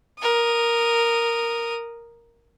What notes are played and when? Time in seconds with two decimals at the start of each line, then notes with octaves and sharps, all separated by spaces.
0.20 A#4 D#6